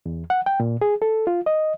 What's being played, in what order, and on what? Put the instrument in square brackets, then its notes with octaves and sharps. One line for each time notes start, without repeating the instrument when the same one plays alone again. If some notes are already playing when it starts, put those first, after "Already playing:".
[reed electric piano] E2
F#5
G5
A#2
G#4
A4
F4
D#5